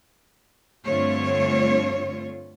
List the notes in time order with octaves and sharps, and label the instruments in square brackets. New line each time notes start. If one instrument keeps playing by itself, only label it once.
[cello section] G2 D3 A3 C4 F4 C#5